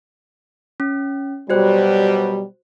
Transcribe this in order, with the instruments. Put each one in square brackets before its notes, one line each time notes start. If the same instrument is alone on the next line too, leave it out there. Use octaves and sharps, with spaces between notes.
[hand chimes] C#4
[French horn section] B2 F#3 G3 [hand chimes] F#4 C5 F#6